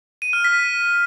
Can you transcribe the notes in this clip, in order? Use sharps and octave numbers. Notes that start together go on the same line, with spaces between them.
D#7
F6
B6